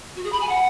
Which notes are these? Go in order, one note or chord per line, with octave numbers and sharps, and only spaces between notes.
F#4
G#4
B5
G#5
F#5